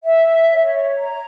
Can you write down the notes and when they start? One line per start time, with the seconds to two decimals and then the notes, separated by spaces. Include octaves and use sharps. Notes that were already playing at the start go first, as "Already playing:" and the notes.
0.03 E5
0.50 C#5
0.98 A#5